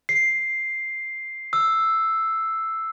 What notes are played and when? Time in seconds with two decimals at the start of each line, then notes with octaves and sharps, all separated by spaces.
0.09 C7
1.53 E6